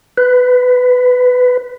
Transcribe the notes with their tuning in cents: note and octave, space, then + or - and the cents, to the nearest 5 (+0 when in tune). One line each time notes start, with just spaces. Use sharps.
B4 +15